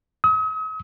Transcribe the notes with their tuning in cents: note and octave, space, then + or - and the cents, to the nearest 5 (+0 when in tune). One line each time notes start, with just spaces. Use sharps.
D#6 +45